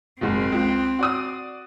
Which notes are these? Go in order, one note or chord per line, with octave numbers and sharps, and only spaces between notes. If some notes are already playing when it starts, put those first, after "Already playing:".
F#1 G#2 B2 C4
C#2
F#4 D5 D#6